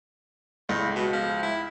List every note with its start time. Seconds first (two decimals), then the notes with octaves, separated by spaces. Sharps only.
0.69 C#2 A2
0.96 B2
1.13 F3
1.43 E4